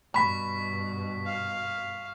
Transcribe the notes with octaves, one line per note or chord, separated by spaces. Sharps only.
G2 B2 B5 C#6 B6
F5